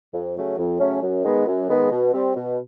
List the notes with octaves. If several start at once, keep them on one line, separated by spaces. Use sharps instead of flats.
F2
C#3 F#3 A3 C#4
F2
C#3 F#3 A3 C#4
F#2
D#3 G#3 B3
F#2
D#3 G#3 B3
B2
G3 C4
B2